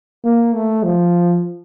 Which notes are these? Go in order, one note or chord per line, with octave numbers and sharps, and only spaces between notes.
A#3
A3
F3